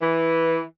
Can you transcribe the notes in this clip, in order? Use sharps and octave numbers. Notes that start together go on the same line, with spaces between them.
E3